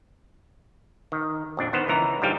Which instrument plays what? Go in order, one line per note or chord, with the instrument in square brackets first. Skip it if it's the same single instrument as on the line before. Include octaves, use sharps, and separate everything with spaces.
[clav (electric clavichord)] D#3
A#1 F2 D4
D#3 B3 C5
C#2 E3 A#4 A#5
G#2 D3 F3 G3 F5 G5